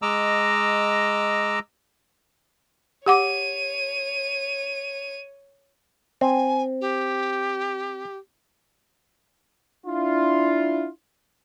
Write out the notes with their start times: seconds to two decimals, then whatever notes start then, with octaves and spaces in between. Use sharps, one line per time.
0.02 G#3 D#5 A#5 D6 E6
3.06 G4 C#5 F#5 D6 D#7
6.21 C4 G#5
6.81 G4
9.87 D4 E4 F4